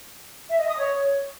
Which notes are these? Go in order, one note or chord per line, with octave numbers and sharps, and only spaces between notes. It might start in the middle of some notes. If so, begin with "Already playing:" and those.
E5
D#5
D#6
C#5